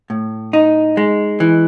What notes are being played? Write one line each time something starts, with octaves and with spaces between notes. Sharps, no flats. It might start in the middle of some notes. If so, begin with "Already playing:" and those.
A2
D#4
G#3
E3